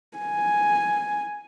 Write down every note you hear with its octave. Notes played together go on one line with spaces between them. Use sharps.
G#5